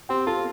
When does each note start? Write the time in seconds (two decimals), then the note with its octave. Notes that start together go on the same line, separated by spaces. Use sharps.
0.09 C4 G4 G5
0.27 F4 A4 A5